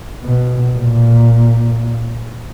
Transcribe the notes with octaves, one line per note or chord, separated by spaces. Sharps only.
B2
A#2